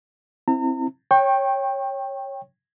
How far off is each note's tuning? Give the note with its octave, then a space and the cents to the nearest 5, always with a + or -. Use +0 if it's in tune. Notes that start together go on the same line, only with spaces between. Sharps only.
C4 +10 E4 +0 A#5 -40
C#5 -10 G5 +5 C#6 -30